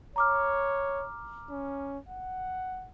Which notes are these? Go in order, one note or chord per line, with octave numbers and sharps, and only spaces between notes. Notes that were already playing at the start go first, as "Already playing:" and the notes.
C#5 A#5 D6 F6
C#4
F#5